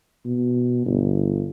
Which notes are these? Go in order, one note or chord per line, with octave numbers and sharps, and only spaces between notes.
B2
G1